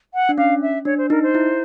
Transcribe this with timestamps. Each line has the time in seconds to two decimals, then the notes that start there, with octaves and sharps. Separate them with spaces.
0.14 F#5
0.29 D4
0.37 C#4 F5
0.61 E5
0.85 D4 C#5
0.97 C5
1.10 D#4 A#4
1.22 C5
1.35 E4